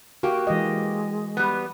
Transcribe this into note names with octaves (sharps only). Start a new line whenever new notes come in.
A#3 F#4 G4
E3 G#3 D#5
G3 B3